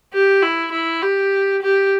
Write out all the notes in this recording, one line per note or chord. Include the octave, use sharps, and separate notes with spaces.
G4
E4
E4
G4
G4